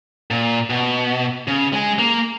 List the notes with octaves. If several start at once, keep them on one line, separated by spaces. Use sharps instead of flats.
A#2
B2
C#3
G#3
A#3